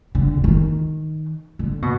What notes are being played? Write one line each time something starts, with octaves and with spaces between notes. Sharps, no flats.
D3
D3
D#3
D3
B2